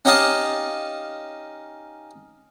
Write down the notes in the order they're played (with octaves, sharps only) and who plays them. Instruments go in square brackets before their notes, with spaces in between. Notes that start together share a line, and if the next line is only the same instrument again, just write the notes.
[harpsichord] C#4 D#4 G4 D#5 F5 A5